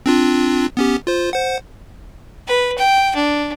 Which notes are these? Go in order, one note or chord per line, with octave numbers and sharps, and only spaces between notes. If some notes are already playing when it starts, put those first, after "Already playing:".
C4 D4 F4
B3 C#4 G4
F4 C5
C5 F#5
B4
G5
D4